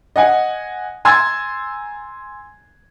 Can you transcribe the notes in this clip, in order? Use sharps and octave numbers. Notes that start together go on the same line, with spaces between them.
D#5 F#5 G#5
G#5 A#5 C6 E6 G#6 A6